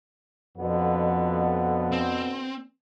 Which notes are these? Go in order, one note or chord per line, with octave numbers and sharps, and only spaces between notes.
F2 B2 D3 B3
C4